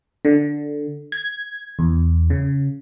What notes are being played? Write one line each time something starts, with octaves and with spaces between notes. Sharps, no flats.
D3
G#6
E2
C#3